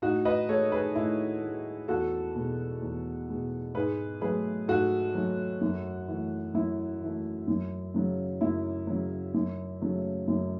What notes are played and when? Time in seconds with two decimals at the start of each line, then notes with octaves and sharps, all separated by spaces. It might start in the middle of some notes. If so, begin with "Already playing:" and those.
0.02 A2 D#4 F#4
0.25 B4 D#5
0.49 G#3 A4 C#5
0.72 G#4 B4
0.95 A2 E4
1.42 G#3
1.88 E2 F#4 A4
2.36 B2 G#3
2.82 E2
3.29 B2 G#3
3.75 G#2 G#4 B4
4.21 F#3 A3 G#4 B4
4.68 G#2 F#4 A4
5.15 F#3 A3
5.61 F#2
6.08 E3 A3
6.54 F#2 E4
7.01 E3 A3
7.48 F#2
7.94 C#3 F#3
8.41 F#2 E4
8.87 C#3 F#3
9.34 F#2
9.81 C#3 F#3 A3
10.28 F#2